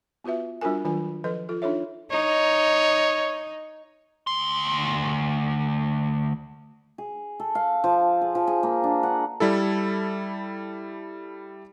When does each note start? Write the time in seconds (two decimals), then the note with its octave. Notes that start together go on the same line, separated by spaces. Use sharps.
0.24 B3 F4 F#4 B4 E5
0.61 G3 D4 F4 F#4 A#4 G#5
0.85 D#3 F#3 D4 F4 G#5
1.24 F3 A4 B4 D#5
1.49 F4 A4
1.62 D4 D#4 F4 A4 C#5 E5
2.11 D#4 C#5
4.27 D2 C6
6.98 G#4
7.40 A4
7.55 F5
7.84 F3
8.21 G#4
8.35 F3
8.47 G#4
8.63 A#3
8.84 D4
9.03 F#5
9.40 G3 E4 A4